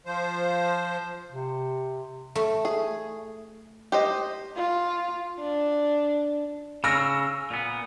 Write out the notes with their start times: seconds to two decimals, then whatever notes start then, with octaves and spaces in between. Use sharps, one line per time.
0.06 F3 C5
1.32 C3
2.35 A3
2.65 G#4
3.92 G4 C5 D#5
4.57 F4
5.39 D4
6.84 C#3 E6 F6 A#6
7.50 A#2 B3